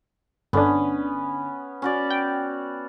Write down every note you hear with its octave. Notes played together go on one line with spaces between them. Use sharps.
G1 D3 B3 C#4 D4
C#4 F#4 D5
G5